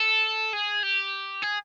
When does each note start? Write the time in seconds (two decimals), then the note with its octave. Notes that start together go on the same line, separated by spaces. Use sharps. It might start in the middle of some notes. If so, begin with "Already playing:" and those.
Already playing: A4
0.53 G#4
0.83 G4
1.42 G#4